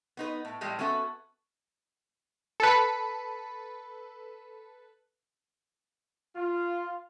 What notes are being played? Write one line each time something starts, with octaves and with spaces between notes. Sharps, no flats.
B3 D#4 B4
A2
A2 E3 G3 G#3 A#3
B3 C#4 F#4 A4 E5
A4 B4
F4